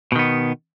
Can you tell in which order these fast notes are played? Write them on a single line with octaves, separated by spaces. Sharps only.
B2 D#3 B3